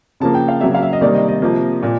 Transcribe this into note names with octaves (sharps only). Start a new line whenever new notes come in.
C#3 F3 A#3 A5
G5
F5
C#3 F#3 A#3 E5
F5
E5
D#5
C3 D#3 G3 A#3 D5
D#5
D#5
C3 F3 A#3
A#2